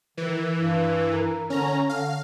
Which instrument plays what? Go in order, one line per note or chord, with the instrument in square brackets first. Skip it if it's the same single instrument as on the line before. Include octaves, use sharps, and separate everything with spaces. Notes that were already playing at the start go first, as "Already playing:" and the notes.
[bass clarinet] D#3 [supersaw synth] E3
[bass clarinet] G2
A#4
[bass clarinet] D3 [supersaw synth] C#4 A#5
[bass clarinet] D3 [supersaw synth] F5